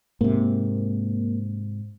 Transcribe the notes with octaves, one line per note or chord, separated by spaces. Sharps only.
G#2 C3 A#3